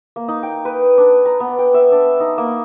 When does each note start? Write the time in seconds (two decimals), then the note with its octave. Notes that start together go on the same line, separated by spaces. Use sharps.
0.16 A#3
0.28 D#4
0.43 G5
0.65 B4
0.98 D4
1.26 A#5
1.40 B3
1.59 G5
1.74 E5
1.92 D4
2.20 D#4
2.38 A#3